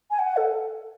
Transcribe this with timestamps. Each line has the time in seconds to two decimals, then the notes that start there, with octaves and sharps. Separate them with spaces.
0.11 G#5
0.19 F#5
0.37 A4